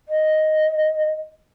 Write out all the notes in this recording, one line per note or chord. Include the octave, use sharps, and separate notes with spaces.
D#5